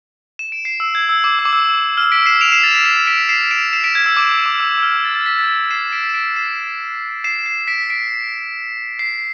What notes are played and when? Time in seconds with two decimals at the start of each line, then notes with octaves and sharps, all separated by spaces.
0.39 E7
0.52 D7
0.65 C7
0.80 E6
0.95 G#6
1.09 E6
1.24 D6
1.39 E6
1.45 D6
1.53 E6
1.97 F6
2.12 B6 D7
2.26 C7 E7
2.41 D7 F7
2.52 C7 E7
2.64 A6
2.74 B6
2.85 C7 E7
3.07 B6 D7
3.29 C7 E7
3.51 D7 F7
3.73 C7 E7
3.84 B6 D7
3.95 G#6
4.06 E6
4.17 D6
4.31 E6
4.46 D6
4.60 E6
4.78 E6
4.83 F6
5.05 A6
5.15 A6
5.26 B6
5.38 A6
5.49 B6
5.71 C7 E7
5.92 B6 D7
6.09 E7
6.14 B6 D7
6.36 C7 E7
7.24 C7 E7
7.46 C7
7.67 B6 D7
7.90 B6 D7
8.99 C7